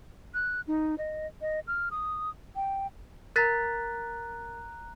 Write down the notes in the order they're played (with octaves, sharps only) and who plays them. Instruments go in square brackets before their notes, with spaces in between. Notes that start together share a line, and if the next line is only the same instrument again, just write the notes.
[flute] F#6
D#4
D#5
D#5
F6
D#6
G5
[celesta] A#4 A6 B6 [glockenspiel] A#5 F#6